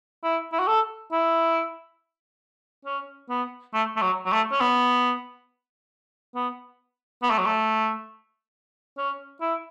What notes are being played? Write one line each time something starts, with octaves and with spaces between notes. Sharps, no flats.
E4
E4
F#4
A4
E4
C#4
B3
A3
A3
F#3
F#3
A3
C#4
B3
B3
B3
A3
F#3
A3
C#4
E4